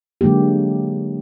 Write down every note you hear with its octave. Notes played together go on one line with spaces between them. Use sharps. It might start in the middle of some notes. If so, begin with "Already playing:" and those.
D3 F#3 G#3 A#3 G4